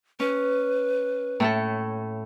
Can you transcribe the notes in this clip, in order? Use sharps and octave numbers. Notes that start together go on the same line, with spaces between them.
C#4 B4
A2 A3 A4